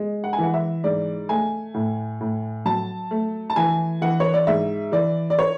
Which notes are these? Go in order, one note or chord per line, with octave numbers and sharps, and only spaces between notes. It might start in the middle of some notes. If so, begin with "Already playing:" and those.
Already playing: G#3
F#5
G#5
E3 F#5
E5
G#2 D5
A3 G#5
A2
A2
F#3 A5
A3
A5
E3 G#5
E3 F#5
C#5
D5
G#2 E5
E3 D5
D5
C#5